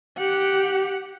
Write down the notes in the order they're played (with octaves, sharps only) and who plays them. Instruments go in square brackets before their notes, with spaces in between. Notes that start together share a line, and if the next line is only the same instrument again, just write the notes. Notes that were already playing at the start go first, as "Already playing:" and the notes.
[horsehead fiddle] G4 F#5